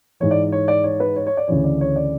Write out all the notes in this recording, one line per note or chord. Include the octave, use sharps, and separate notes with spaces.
G#2 E3 C#5
D5
C#5
D5
C#5
B4
C#5
C#5
D5
D2 C#3 E3 C#5
D5
C#5
D5